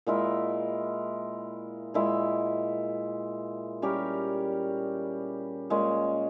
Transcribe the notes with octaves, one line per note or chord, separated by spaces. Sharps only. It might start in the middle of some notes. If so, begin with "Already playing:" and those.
A#2 G#3 E4 A#4
A#2 G#3 E4
G3 C#4 G4 A#4
A#2 G#3 C#4